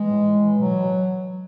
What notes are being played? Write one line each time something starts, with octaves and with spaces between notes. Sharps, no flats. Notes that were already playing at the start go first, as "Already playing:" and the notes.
Already playing: E3 G#3
A2
A2
E3
B2 F#3
B2